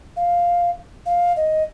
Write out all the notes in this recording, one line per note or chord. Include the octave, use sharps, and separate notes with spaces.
F5
F5
D#5